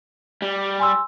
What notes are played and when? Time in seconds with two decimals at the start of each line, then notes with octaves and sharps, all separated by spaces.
0.42 G3
0.80 G#5 C6 E6